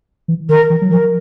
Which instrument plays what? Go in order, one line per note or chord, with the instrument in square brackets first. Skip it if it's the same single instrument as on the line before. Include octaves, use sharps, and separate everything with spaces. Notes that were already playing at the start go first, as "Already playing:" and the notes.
[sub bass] E3
[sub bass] D#3 [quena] A#4
[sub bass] E3
F#3
[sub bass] F3 [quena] A#4